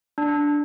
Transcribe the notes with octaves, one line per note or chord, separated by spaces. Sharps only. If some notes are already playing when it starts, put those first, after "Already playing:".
D4